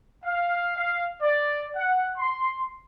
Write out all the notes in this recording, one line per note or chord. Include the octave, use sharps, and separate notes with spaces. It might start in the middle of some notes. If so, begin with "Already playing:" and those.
F5
F5
D5
F#5
C6